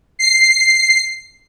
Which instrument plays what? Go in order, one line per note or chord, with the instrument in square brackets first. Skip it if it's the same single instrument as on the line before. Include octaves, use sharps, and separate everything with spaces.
[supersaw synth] C7